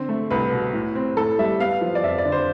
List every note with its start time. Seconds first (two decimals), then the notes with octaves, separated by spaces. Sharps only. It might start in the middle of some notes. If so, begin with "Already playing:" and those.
Already playing: D3 C4
0.09 A3
0.30 C2 B4
0.53 B2
0.73 A2
0.95 C4
1.17 A2 A4
1.39 G3 E5
1.60 B3 F5
1.81 F3
1.95 D5
2.04 F2 E5
2.18 D5
2.25 D3
2.32 C5